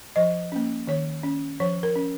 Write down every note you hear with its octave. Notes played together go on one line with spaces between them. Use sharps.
F3 D#5
A#3 C#4
D#3 C#5
C#4
F3 C#5
A#4
C#4